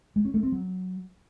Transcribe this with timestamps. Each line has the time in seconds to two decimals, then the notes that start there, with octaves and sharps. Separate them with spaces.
0.16 G#3
0.25 C#4
0.34 A3
0.43 C4
0.52 F#3